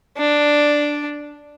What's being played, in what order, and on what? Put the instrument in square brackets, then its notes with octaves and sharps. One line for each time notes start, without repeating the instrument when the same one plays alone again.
[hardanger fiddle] D4